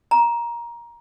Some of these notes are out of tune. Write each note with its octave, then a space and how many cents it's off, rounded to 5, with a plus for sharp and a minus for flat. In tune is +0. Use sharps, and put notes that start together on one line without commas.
A#5 +15